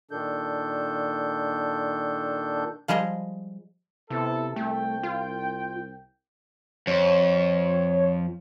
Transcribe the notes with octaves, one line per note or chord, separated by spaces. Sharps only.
A#2 D#3 D4 A4 G6
F3 G3 G#3 G#4 D#5
C3 B3 E4 A4
C2 A3 G5
F4
F2 C#5